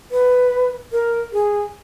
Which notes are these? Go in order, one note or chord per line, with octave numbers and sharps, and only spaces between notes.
B4
A#4
G#4